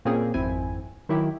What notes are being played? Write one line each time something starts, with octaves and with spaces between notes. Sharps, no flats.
A#2 A#3 C4 C#4 G#4
G#1 F2 C4 E4 G#5
D#3 F#3 E4 G4